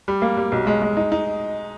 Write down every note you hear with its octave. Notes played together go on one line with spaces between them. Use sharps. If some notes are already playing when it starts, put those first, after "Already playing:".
G3
A#3
G3
B1
G#3
G#3
D#4
D#4